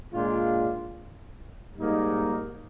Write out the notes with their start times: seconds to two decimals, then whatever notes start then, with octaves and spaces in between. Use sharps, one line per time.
0.12 A#2 G#3 D4 F4
1.77 G#2 G3 A#3 D#4